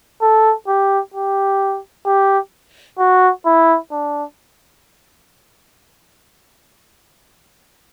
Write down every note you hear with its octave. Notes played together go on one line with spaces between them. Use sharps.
A4
G4
G4
G4
F#4
E4
D4